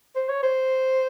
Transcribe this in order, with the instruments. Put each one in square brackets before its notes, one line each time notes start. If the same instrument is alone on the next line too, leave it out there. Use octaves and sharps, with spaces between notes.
[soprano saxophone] C5
C#5
C5